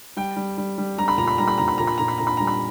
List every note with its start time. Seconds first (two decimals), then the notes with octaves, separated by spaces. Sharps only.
0.17 G3 G5
0.37 G3
0.58 G3
0.78 G3
0.98 G3 A#5
1.08 B5
1.18 A#2 A#5
1.28 B5
1.38 G3 A#5
1.48 B5
1.58 A#2 A#5
1.68 B5
1.78 A#2 A#5
1.87 B5
1.98 A#2 A#5
2.08 B5
2.18 A#2 A#5
2.27 B5
2.37 G3 A#5
2.47 B5